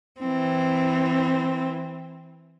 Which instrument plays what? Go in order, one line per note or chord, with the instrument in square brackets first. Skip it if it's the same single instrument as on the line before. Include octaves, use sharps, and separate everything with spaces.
[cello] E3 C4